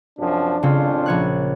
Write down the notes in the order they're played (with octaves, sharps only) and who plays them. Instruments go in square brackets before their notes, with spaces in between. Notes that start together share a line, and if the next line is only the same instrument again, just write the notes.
[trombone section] F#2 C3 F3 [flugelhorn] D4
[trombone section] G#1 F2 F4 [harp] C#3 C4 C#4
[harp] A#1 C#5 F#6